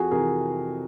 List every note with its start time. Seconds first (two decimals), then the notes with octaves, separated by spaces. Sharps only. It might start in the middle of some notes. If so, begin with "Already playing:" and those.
Already playing: F2 F#4 G#4
0.11 C3 E3 G#4 A#4